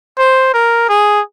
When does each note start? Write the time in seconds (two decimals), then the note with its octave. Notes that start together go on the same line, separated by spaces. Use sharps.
0.19 C5
0.54 A#4
0.89 G#4